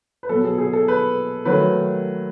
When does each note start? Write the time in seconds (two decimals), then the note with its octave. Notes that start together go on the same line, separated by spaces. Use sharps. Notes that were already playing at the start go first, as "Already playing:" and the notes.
0.23 B4
0.29 B2 F#3 B3 A4
0.44 G#4
0.58 G#4
0.73 A4
0.88 B4
1.45 D#3 F#3 A3 B4